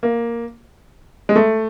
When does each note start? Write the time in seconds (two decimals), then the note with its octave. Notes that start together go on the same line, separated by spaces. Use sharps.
0.03 A#3
1.29 G#3
1.36 A3